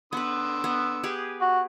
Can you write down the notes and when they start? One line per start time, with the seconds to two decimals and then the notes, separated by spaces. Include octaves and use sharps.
0.13 D3 B3 B4 C6 E6
0.64 B3
1.04 G4 G#4 B4
1.41 F#4